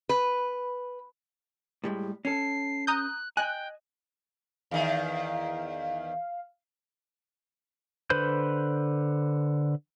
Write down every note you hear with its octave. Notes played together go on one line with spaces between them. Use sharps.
B4
A2 G3 G#3
C#4 A4 C7
A#5 D#6 F#6 G6
D#5 G5 G#5 F#6
E2 D#3 F5
D3 B4 C5 B5 G6